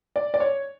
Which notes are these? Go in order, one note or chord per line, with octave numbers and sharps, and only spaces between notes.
D5
D5
C#5